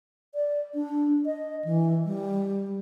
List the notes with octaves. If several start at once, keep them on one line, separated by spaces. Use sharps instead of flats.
D5
D4
D#5
E3
G3